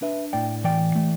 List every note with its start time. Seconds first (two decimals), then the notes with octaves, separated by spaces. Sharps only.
0.02 D4 B4 E5
0.33 A2 D5 G5
0.64 E3 D5 G5
0.96 A3